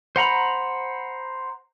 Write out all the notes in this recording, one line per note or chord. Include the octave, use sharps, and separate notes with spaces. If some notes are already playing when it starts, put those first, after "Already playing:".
C5 F#5 A#5 B5